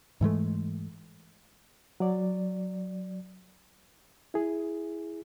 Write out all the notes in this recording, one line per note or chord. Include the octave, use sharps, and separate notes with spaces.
G#2 E3 G#3 A3
F#3 D5
E4 G#4